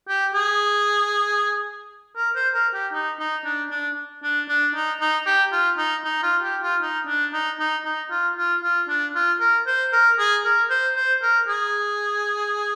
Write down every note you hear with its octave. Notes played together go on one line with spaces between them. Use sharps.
G4
G#4
A#4
C5
A#4
G4
D#4
D#4
D4
D4
D4
D4
D#4
D#4
G4
F4
D#4
D#4
F4
G4
F4
D#4
D4
D#4
D#4
D#4
F4
F4
F4
D4
F4
A#4
C5
A#4
G#4
A#4
C5
C5
A#4
G#4